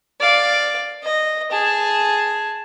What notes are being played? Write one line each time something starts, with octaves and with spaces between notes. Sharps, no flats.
D5 F5
D#5
G#4 A5